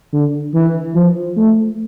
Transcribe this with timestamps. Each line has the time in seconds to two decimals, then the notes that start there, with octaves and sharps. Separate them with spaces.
0.13 D3
0.54 E3
0.95 F3
1.37 A3